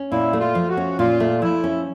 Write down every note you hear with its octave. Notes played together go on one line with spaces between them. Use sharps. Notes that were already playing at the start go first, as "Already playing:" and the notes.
Already playing: C#4
A#2 E4
A3
F4
F3
F#4
C#4
A#2 F4
A3
F3 E4
C#4